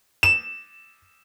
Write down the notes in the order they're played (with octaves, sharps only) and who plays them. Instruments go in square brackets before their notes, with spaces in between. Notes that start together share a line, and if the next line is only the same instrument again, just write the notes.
[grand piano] E7